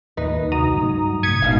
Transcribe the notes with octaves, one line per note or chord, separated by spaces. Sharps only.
D#2 A#2 D#4 B4
C2 D3 F#4 A#5 D#6
G2 F#3 A3
C2 A2 D#6 G#6 B6 C#7
G1 G#2 B2 F5